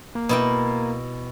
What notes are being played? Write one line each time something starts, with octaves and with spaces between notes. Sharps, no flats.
A#3
B2 E4 G5